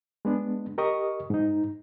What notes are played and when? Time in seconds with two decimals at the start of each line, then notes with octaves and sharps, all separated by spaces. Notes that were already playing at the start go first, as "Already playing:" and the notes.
0.25 G#3 B3 D4
0.78 G4 A#4 D#5 C#6 D#6
1.30 G#2 D#4